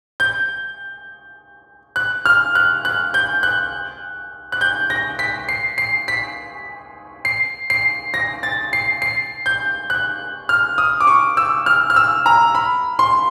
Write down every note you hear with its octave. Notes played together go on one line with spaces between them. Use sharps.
G6
F#6
F6
F#6
F#6
G6
F#6
F#6
G6
A#6
B6
C7
C7
B6
C7
C7
A#6
A6
C7
C7
G6
F#6
F6
D#6
D6
C#6
E6
F6
F6
E6
A#5
B5
C6